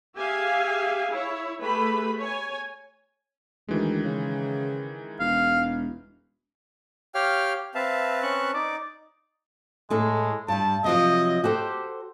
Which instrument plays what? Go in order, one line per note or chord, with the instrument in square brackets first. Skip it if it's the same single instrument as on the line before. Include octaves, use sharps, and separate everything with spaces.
[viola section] G4 G#4 E5 F5 G#5
E4 C#5
A3 G4 G#4 B4 B5
C#5 G#5
[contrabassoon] D2 [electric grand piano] D#3 E3 G#3
[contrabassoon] C#3
[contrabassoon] E1 [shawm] F5
[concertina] G4 C#5 F5 [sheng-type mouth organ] G5 F6
[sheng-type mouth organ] C4 B4 A5 [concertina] E5 F5
[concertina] C#4 C#6 F#6
[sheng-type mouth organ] D#4 [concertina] D5 D6
[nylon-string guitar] A2 A4 [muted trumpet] G#3
[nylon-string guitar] G2 G3 [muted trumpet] A5
[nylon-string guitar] C3 F3 F#3 [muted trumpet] D#5
[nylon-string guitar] F#4 A4 C5 [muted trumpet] G4